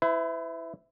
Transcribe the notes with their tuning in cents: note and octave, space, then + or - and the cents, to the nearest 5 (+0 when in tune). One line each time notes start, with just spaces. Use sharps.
E4 +0 B4 +45